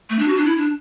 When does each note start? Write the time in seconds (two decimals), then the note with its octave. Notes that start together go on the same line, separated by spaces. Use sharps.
0.10 A3
0.19 D4
0.28 F#4
0.37 D4
0.45 E4
0.57 D4